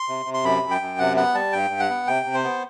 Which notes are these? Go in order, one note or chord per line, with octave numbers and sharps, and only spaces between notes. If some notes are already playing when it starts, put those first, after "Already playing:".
Already playing: C6
C3
C3
C6
F#2 B5
F#2
G5
F#2
C3 F#5
B3 F#5
G3 A5
G2 G5
G2
F#5
B3
C3 G5
C3
C5
B3